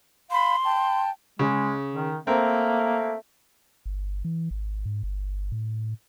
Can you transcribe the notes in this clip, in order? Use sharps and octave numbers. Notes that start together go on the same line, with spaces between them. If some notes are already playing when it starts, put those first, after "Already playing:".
F5 B5 C6
G5 A5
C#3 G#3
D#3
A3 A#3 C4 A#4
G1
E3
G#1
G#2
G1
A2